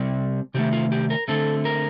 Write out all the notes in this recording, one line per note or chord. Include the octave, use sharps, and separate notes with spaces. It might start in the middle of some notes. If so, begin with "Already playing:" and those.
Already playing: C3 G3 C4
C3 D#3 A3 G4
F4
G4
A#4
D3 A3 C4 A4
A#4